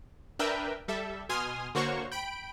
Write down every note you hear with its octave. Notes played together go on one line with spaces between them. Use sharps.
D4 A#4 B4 E5 G5
G3 A4 E5
B2 G#5 C6 D#6 F6
D3 A#3 F#4 C5 C#5 C#6
G5 B5 D7